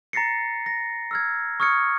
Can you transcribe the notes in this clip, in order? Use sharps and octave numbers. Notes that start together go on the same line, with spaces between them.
A#5 A6 A#6 C7 C#7
A#6
E6 F6 G#6
C#6 D#6 F6 G#6 C#7